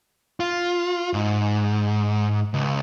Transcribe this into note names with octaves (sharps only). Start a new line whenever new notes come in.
F4
G#2
C#2